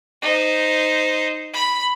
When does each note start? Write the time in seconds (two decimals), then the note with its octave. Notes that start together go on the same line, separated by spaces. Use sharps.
0.22 D#4 C5
1.53 B5